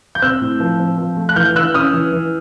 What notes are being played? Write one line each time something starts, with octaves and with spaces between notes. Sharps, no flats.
G6
C4 E6 F#6
A2
F3
C4
F3
A3
F#6
E3 F6 G6
E3 E6 F#6
C#4 D#6 F6
E3
E3